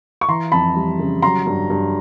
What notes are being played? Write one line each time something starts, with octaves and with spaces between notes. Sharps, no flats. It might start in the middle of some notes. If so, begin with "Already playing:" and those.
C#6
E3 A#5 C6
F2 A5 B5
G3
C#3
F#3 A#5 C6
G2
G2